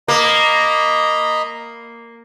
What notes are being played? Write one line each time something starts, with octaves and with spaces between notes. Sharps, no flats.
A#3 D#5 A#5 B5